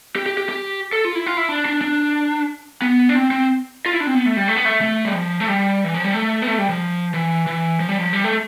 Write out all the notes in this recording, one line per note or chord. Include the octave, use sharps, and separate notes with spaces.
G4
G4
G4
G4
A4
F4
E4
F4
E4
D4
D4
D4
B3
D4
C4
C4
F4
E4
D4
C4
B3
A3
G3
A3
B3
A3
A3
G3
F3
A3
G3
E3
F3
G3
A3
B3
A3
G3
F3
E3
E3
F3
G3
F3
G3
A3